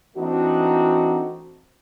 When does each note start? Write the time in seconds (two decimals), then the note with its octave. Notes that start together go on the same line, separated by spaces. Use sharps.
0.16 E3 A3 C4 D4 D#4 F#4